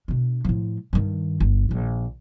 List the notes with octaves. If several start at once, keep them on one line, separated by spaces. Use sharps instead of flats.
B2 D4
A2 F3
G2 D#3
G1
A#1 D#3